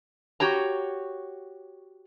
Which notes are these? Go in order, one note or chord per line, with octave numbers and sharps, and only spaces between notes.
F#4 G4 C#5 A#5